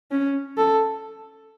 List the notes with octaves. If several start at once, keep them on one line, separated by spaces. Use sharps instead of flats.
C#4
A4